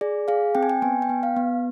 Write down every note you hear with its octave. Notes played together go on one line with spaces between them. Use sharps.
G#4 D5
G#4 F5
C4 G5
G#5
G5
B3 G#5
G5
B3
F5
B3